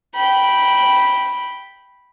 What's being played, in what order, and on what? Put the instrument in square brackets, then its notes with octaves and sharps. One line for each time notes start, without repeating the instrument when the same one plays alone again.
[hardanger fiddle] G5 B5